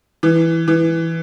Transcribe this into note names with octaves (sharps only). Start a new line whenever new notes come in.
E3
E3